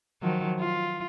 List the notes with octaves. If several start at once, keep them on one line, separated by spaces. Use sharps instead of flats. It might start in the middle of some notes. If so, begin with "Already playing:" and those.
D#3 F3 F#3
F4